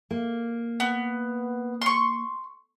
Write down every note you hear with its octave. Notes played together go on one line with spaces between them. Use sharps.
A#3
B3
C6 C#6